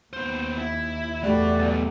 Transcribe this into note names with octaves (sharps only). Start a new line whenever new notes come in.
D#2 B3 C5
E4
E2 A3 F#4 G4 D5 B5
B1